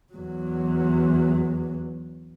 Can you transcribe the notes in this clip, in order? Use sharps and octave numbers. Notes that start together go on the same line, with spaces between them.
E2 F#3